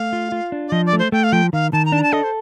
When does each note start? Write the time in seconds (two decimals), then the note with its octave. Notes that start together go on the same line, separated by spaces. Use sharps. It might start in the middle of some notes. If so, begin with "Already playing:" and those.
Already playing: A3 F5
0.13 F4
0.32 F4
0.52 D4
0.68 D5
0.72 F3 D#5
0.86 D5
0.93 A3
0.99 C5
1.12 A3 G5
1.24 F5
1.32 F3 G5
1.53 D#3 F5
1.73 D#3 A5
1.85 A#5
1.92 D4 A5
1.99 A#5
2.03 A5
2.13 A4 D#5
2.23 C5